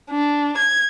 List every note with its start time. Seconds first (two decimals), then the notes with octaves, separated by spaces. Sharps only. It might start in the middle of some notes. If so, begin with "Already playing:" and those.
0.11 D4
0.57 G#6